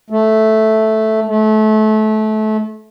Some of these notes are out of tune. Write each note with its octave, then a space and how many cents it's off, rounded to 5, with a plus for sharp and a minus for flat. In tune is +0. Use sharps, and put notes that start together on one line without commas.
A3 -5
A3 -25